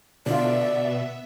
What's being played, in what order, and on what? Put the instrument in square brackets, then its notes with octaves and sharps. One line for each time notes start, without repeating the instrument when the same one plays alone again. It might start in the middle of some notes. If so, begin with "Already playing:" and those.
[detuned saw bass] B2 [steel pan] D3 F4 [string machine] B3 E5 [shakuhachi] D5